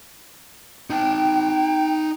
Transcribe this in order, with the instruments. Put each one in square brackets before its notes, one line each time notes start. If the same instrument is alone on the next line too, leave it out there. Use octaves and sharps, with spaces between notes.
[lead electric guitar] D#4 A5 [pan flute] G5